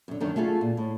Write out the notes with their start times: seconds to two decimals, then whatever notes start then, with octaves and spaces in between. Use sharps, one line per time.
0.08 F#2 D3
0.20 F#2 D3 D#3
0.36 A3 F4 F#4 G#4 A4
0.61 A#2
0.77 A2